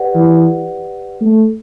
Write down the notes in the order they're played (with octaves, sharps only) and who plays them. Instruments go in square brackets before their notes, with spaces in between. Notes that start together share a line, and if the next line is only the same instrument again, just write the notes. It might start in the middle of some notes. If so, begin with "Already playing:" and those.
Already playing: [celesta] G4 B4 D5 F#5
[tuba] E3
A3